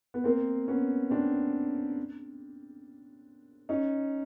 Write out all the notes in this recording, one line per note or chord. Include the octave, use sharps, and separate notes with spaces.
B3
A#3 C4
B3 C#4
C4 D4
C#4 D#4